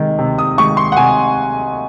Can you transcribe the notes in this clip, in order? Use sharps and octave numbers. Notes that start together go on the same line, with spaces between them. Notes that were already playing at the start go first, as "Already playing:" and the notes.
Already playing: C3 D#3 G#3
C3
D#6
D#3 G#3 C#6
C6
F#5
C3 G#5